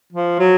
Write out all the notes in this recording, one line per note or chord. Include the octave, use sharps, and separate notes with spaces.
F3
F#3